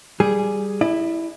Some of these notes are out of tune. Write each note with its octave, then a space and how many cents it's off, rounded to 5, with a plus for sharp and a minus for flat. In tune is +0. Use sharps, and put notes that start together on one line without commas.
G3 +0 G#4 +0
E4 +0 D5 +40